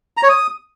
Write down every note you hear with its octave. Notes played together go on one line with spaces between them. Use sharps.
A#5
C#5
D#6